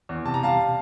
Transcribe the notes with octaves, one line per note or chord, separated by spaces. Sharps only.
E2
C3 A5
A#5
G3 F5 A5
C3